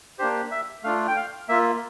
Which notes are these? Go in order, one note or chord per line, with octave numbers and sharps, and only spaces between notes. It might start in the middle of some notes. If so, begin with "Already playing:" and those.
A#3 D4 G4 C5
E5
A3 D4 F4 F5
G5
F5
A#3 F4 E5